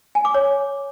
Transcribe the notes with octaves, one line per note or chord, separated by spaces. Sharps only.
G#5
D6
C#5